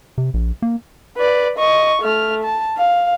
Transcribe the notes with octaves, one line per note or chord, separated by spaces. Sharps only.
C3
A#1
A#3
B4 D5
D#5 C#6
A3 F6
A5
F5